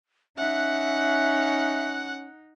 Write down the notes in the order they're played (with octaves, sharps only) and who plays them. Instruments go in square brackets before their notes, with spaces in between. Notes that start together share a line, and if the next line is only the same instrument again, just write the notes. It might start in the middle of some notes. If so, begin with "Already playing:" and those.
[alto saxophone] C#4 [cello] D#4 [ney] E5 [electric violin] F#5 F#6